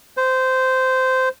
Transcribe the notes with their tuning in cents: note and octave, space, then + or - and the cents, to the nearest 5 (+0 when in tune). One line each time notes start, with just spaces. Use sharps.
C5 -15